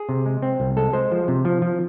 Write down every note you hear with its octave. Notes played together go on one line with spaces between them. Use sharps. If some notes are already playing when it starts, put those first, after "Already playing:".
Already playing: G#4
C3
G#3
C4
C2
G#3 A4
G#3 C5
F3
C3
F3
F3